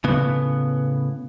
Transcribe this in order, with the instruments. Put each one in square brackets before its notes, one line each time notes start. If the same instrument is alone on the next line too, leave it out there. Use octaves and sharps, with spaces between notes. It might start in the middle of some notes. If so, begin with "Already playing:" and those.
[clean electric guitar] A2 C#3 B3